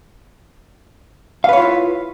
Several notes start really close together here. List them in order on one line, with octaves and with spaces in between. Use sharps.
F5 B4 C#5 F4 E4